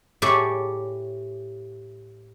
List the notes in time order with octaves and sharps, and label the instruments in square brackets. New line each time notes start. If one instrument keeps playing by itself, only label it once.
[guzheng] A2 G4 G#4 C#5 D5 E5